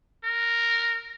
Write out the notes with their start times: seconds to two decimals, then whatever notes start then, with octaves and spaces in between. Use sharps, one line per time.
0.24 A#4